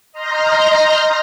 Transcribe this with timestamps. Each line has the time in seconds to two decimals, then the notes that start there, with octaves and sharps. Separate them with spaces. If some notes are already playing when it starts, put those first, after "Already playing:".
0.12 D#5 A#5 C6 F6 G6 A#6